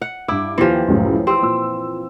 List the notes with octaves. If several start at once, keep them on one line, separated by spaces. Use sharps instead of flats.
F#5
G2 E4 D6
D#2 E3 F3 F4 G4
C#2 F#2 A2
C4 G4 E6
A#2 E6